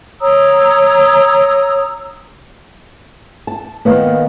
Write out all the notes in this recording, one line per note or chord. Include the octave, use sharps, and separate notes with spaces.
C#5 A#5 D#6 E6
A5
D#3 A#3 B3